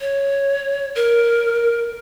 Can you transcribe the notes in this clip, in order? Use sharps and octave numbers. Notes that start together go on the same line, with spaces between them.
C#5
A#4